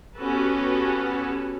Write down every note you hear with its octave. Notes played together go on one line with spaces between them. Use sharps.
B3 C#4 F#4 G4 A4 B4